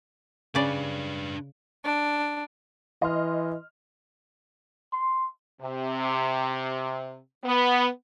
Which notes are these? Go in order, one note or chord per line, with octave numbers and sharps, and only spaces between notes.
C#3 D4 B4 D5
D4
E3 D#5 C6 F6
C6
C3
B3